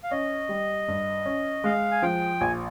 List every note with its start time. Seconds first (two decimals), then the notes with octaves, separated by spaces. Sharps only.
0.03 F5
0.11 C#4 D#5
0.49 G3
0.88 G2
1.25 C#4
1.64 G#3 F5
1.92 G#5
2.02 F3 G5
2.41 A#1 G#5